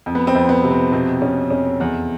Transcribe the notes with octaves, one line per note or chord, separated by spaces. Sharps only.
F2
B3
C4
F2
B3
C3
C4
B2 C4
B2 C#4
F1 C#4
E2